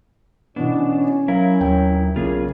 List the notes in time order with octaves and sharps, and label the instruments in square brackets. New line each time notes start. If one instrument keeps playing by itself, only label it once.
[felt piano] B2 E3 B3 [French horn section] C#4 [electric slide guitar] D4
[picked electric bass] F#3 [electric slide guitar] E4 A#4 [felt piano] F5
[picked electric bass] D#2 F#3 [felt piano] G5
[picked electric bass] B1 C#3 [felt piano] A#3 [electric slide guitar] F4 G#4